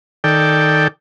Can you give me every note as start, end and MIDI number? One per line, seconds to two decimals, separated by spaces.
0.24 0.88 51
0.24 0.88 69
0.24 0.88 74
0.24 0.88 79